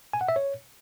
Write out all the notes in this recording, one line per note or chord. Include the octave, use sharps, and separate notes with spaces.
G#5
F#5
E5
C#5